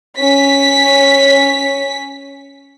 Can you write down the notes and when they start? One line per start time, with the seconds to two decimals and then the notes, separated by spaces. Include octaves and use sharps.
0.17 C#4 B6